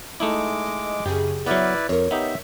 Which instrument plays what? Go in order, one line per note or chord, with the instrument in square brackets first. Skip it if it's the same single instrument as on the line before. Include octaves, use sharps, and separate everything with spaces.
[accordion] G#3 D6 [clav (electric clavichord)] A3 D#4 E4
[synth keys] D#5
[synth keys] F#2 C#3 G#4 [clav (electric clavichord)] G4
[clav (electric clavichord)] F#3 B3 [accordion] E4 B4 D5 [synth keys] E5 D6 F6
[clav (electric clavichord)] F2 [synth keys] A#4 C#5
[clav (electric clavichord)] B3 D#4 G4 [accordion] E5